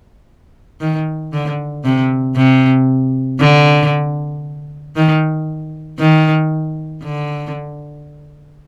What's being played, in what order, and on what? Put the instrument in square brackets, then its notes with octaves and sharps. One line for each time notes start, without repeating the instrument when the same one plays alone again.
[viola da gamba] D#3
D3
C3
C3
D3
D#3
D#3
D3